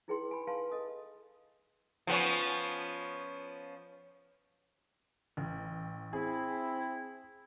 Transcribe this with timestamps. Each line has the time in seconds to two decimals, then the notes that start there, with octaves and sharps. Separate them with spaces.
0.08 D#4 E4 G#4 B4 G5 C6
0.31 G#5 B5
0.47 B4 F5 G#5 A5 C6
0.72 A4 D#5 D#6
2.07 F3 B3 C#4
5.37 A1
6.13 C4 E4 G#4